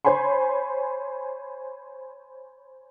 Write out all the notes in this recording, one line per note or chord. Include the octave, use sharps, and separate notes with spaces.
C5 C#5 G#5 B5 C6